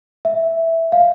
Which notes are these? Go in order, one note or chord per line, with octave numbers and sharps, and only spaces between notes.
E5
F5